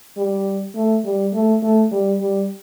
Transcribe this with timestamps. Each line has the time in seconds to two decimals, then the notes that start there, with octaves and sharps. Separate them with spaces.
0.17 G3
0.75 A3
1.05 G3
1.33 A3
1.63 A3
1.91 G3
2.21 G3